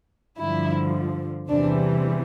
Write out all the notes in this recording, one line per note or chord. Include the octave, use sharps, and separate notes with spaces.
G2 D3 F3 E4
E2 C3 E3 G3 D4